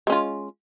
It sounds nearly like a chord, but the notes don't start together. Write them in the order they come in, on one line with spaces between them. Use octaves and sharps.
G#3 C#4 F4